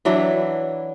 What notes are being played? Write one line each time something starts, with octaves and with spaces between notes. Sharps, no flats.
E3 F#3 D4 E4